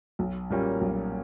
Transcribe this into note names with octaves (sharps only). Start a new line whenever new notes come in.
B1
A#2 G3 A#3 C#4
B1